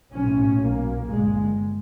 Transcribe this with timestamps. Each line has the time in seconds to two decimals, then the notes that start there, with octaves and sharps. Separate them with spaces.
0.13 B1 A2 C#4
0.60 B1 A#2 A#3
1.07 G1 G2 G#3